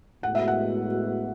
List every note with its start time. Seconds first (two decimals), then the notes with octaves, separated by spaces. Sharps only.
0.23 A2 G#3 B3 F#4 F#5
0.35 E5
0.48 F#5